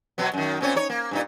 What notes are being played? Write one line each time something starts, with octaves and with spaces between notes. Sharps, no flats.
B2 F#3 B3
F#2 D#3
A#2 C4 C#4
D#4 C#5
A#3
G2 A#2 D#4